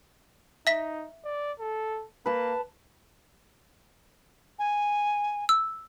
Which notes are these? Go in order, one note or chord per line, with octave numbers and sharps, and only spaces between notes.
D#4 E5 B6
D5
A4
A#3 B4 A5
G#5
E6